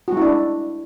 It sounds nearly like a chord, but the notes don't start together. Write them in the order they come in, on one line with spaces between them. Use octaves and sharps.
F#4 G#3 E4 D4